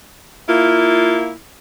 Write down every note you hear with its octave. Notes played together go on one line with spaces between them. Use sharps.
A#3 E4 F4